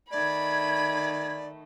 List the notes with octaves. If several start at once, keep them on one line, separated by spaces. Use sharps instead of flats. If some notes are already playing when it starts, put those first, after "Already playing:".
D#3 A3 D5 B5 G#6